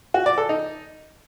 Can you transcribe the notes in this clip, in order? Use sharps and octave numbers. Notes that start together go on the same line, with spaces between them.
F#4
D5
A4
D#4